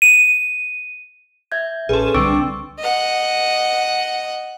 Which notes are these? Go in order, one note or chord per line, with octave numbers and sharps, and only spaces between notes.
D#7
E5 G6 G#6
A1 C#4 G#4 A4 B4 C6
C2 D3 G3 C4 D4 C#6 D6 E6
D#5 F#5